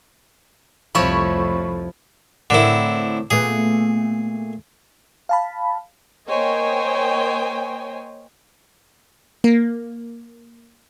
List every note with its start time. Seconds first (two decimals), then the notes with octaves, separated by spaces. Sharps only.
0.95 C2 F2 F3 A3 E4 C#5 B5 C#6
2.50 A2 D3 C4 E4 A#4
3.31 A#2 A3 B3 G#4
5.29 F5 A5 B5
6.28 A#3 C5 C#5 D#5 G5 G#5
9.44 A#3